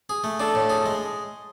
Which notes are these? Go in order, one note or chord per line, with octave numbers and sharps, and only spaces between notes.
G#4
A3
D4 A4
A2
G#4
G#3